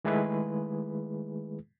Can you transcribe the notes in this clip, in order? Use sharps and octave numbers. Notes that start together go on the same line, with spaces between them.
D#3 G#3 A3 E4 G#4 B4